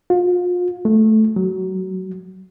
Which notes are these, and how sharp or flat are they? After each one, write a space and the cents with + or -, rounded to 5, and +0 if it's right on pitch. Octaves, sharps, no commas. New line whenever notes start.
F4 +35
A3 -10
F#3 +20